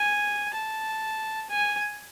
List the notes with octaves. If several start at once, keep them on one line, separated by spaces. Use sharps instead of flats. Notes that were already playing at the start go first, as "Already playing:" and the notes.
Already playing: G#5
A5
G#5